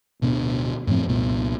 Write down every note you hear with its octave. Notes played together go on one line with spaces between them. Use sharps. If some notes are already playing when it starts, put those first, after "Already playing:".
D1 B2 B3 D4
F#2 A2 F3 C4
C2 A#2 B3